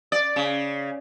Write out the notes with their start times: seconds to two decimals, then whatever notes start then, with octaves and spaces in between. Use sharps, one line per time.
0.12 D5
0.36 C#3